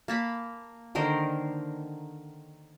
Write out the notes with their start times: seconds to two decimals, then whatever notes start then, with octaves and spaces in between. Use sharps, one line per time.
0.08 A#3 A5 B5
0.95 D3 D#3 A#4 C5